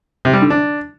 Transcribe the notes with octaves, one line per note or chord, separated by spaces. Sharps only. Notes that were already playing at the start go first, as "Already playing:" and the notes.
C3
G3
D3
D4